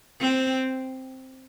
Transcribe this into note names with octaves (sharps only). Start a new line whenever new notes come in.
C4